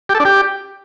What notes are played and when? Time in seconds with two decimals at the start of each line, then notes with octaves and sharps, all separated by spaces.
0.09 G4
0.15 A4
0.20 D4
0.25 G4